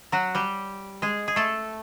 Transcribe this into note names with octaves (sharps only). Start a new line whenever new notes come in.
F#3 F#4
G3 G4
G#3 G#4
G#4
A3 A4